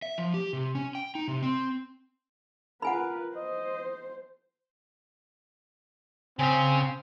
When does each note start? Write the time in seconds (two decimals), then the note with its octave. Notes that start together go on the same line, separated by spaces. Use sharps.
0.02 E5
0.18 F3
0.34 G4
0.53 C3
0.75 C#4
0.95 G5
1.15 D#4
1.28 C3
1.42 C4
2.82 F4 A#4 B4 F#5 G#5 B5
3.36 C5 D#5
6.39 C#3 C4 F5 G#5